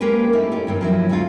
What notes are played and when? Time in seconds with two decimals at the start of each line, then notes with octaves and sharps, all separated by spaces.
0.01 G#3 A#3 C#4 G4 B4
0.33 A3 A#3 C#4 D#4 E4
0.52 C#4 G4
0.67 G2 D#3 C4
0.81 F3 F#3 E4
1.09 D2 G#3 B3 C#4 F4